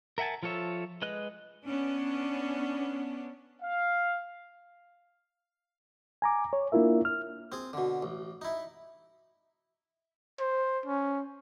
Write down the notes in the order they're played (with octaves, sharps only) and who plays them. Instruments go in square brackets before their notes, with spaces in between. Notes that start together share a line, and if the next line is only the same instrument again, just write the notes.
[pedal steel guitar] A#4 E5 F#5 G#5 A5
F3 F4 A4 C#5 E5
G#3 B4 D#5 F#6
[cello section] B3 C#4 D4
[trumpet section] F5
[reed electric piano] G#5 A#5 D6
C#5
A#3 D4 E4 F4 A#4 E5
F6
[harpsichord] C4 G#4
B2 D3
A1
D#4 E4
[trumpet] C5
C#4